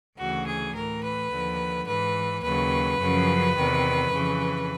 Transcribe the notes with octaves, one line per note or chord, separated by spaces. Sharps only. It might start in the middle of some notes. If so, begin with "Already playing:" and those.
D2 C#3 E3 F#4
G#4
A2 E3 A#4
B4
D#2 D3 F3
G#2 E3 B4
D#2 C#3 F#3 B4
F#2 C#3 F3
E2 C3 D#3
F2 C#3 E3